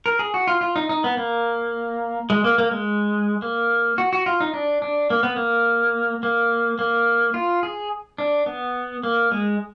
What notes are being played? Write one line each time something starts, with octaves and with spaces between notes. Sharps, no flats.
A#4
G#4
F#4
F4
F4
D#4
D#4
B3
A#3
G#3
A#3
A#3
G#3
A#3
F#4
F#4
F4
D#4
D4
D4
A#3
B3
A#3
A#3
A#3
F4
G#4
D4
B3
A#3
G#3